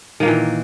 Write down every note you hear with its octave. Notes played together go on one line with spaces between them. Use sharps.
A#2 D#3 E3 A#3